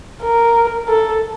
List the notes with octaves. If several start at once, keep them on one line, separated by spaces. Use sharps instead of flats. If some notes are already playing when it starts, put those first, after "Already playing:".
A#4
A4